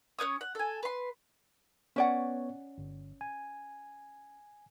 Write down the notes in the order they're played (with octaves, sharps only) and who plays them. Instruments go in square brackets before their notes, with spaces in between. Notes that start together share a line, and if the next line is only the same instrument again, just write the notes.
[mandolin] C#4 B4 C#5 D#6
F#5
A4 G#5
B4 C6
[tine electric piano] B3 C#5 [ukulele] C#4 D5 F#5
[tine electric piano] G1
G#5